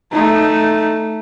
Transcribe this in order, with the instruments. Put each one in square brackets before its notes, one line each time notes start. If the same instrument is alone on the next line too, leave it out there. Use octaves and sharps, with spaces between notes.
[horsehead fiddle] A3 D#4